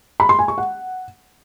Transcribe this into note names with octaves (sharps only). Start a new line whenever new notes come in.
B5
C6
G#5
C#6
F#5